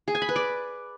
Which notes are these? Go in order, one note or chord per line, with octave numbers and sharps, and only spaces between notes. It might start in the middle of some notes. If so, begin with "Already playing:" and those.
G#4
G#5
B5
B4
D5